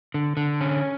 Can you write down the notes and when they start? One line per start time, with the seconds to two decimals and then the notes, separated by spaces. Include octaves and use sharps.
0.14 D3
0.37 D3
0.61 C#4